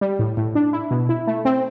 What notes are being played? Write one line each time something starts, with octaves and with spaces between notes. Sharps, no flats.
G3
A2
A2
D4
E4
B2
E4
A3
C4